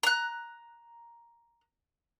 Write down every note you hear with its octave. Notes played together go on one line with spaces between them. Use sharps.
A#5 F#6